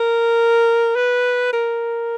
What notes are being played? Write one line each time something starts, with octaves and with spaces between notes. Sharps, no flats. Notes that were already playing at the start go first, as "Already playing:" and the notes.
Already playing: A#4
B4
A#4